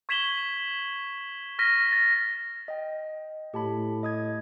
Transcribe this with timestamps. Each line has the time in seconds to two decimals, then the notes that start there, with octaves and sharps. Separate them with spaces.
0.09 C#6 G#6 B6 E7 F#7 G7
1.59 C#6 F6 A#6 B6 D#7
1.92 A6
2.68 D#5 G5
3.54 A2 G4 A5 B5
4.03 D#5 D#6 G#6